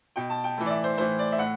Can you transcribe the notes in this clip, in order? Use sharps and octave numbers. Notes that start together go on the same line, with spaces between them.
B2 G5
A5
G5
A2 E3
D5
E5
C5
A2 E3 C5
D5
E5
A2 F#5